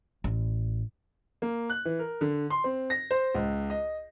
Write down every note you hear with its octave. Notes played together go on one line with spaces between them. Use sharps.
A1
A#3
F#6
E3
A#4
D3
C6
C4
A#6
C5
C#2
D#5